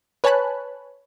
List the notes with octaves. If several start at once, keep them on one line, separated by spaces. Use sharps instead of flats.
B4 C#5 G#5 A5 B5 F#6